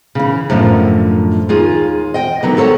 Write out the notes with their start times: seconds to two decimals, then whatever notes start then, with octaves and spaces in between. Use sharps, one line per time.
0.15 C#3 E3
0.50 F#2 A2 D3 D#3 F3
1.49 D#2 F4 G#4
2.14 D#5 G5
2.43 D3 D#3 F#3 B3
2.57 D3 A4 A#4 C#5 F#5